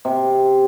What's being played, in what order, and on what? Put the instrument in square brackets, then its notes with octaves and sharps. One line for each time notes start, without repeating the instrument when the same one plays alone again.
[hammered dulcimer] C3